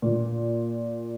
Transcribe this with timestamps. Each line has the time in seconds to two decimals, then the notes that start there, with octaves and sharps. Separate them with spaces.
0.02 A#2